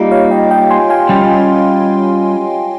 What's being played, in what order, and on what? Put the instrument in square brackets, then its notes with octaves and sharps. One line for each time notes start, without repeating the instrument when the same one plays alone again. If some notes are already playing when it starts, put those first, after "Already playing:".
Already playing: [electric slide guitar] G3 A#3 D#4 [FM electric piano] F4 G4
[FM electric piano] C#5 F5
D#5 G5
D#5 G5
G#5 C6
F5 G#5
[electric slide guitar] G3 C#4 F4